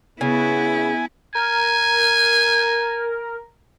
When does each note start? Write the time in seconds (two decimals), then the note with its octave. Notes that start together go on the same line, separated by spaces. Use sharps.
0.21 C#3 B3 E4 G#5
1.35 A#4 G#5